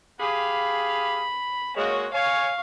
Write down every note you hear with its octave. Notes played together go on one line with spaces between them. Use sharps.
G4 G#4 F5 B5
G#3 A#3 F#4 C#5
C#5 F5 G#5 C#6